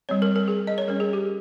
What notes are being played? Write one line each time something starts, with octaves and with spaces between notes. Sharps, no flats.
G3 C4 C#5
A#4
A#4
G#4
D#5
C#5
G3 C#4 A#4
G#4
G4